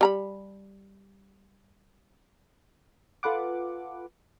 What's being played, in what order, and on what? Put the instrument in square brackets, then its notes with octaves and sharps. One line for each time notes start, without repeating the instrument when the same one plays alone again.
[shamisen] G3 A#5 B5
[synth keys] F4 A4 B4 F#5 D6